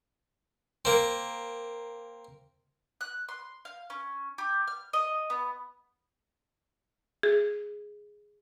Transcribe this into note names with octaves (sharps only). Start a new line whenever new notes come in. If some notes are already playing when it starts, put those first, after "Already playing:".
A#3 C4
F#6
C6
F5
C#4
G4
F6
D#5
B3
G#4